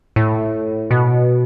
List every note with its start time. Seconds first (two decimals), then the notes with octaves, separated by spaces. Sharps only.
0.16 A2
0.91 B2